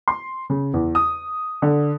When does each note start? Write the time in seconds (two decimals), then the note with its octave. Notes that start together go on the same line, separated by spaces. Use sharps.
0.08 C6
0.50 C#3
0.74 E2
0.95 D#6
1.62 D3